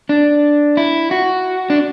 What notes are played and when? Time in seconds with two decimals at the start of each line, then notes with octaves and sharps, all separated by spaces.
0.09 D4
0.77 E4
1.11 F#4
1.70 D4